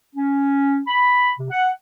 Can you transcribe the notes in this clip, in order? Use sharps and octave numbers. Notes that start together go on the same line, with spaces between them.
C#4
B5
C3
F#5